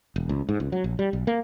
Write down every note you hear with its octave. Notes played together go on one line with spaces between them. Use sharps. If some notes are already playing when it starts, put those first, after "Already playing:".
E1
C#2
G#2
C#2
F#3
A#1
G3
B1
A#3